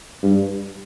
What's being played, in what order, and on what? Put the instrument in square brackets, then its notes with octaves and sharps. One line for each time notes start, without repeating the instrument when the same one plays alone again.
[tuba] G2